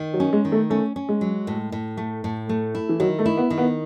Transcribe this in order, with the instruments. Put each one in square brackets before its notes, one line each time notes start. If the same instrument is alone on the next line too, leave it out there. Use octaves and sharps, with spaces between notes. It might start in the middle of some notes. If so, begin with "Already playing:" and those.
Already playing: [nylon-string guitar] D#3
[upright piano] F#3
[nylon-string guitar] C#4
[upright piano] G#3
[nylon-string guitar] D#3
[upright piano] A3
[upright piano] A3 [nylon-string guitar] C#4
[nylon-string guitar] C#4
[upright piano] G#3
[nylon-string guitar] F#3
A2
A2
A3
A2
A3
E4
[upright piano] E3
[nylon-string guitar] D#3 [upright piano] F#3
[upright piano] A3
[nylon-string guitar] E4
[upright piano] B3
[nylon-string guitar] D#3
[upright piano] B3